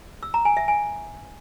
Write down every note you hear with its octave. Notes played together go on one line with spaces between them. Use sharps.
E6
A#5
G#5
E5
G#5